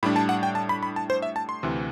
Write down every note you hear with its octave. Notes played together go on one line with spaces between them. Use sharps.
A2 G3 D4 B5
A5
F#5
G5
A5
B5
B5
A5
C5
E5
A5
C6
D2 C3 E3